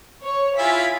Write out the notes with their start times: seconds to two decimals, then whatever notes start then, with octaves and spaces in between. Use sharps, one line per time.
0.23 C#5
0.58 E4 F4 G#4 B6